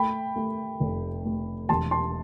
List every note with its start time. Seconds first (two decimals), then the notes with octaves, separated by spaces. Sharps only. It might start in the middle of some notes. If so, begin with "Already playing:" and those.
Already playing: A3 G5 B5
0.36 A3
0.80 F1
1.25 A3
1.69 E1 A5 C6
1.91 A5 C6